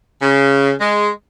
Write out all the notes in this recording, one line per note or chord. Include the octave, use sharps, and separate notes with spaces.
C#3
G#3